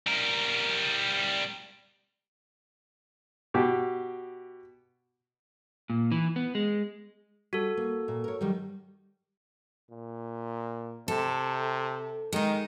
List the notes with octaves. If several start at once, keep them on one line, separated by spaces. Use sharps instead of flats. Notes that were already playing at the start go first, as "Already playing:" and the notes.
G3 A#4
B2 G4
A#2
E3
B3
G#3
G3 F#4 A4
A#3
A#2
A#4 C#5
D#3 F#3 G3
A#2
C3 A4
D#3 G#3 D#4